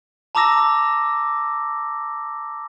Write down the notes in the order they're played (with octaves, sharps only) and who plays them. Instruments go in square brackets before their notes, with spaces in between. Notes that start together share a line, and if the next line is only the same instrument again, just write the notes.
[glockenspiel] A5 A#5 D6 E6 A#6